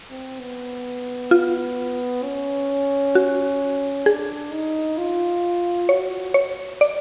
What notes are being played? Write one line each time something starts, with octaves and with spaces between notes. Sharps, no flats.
C4
B3
F4
C#4
F#4
D4 G#4
D#4
F4
F#4 C#5
C#5
D5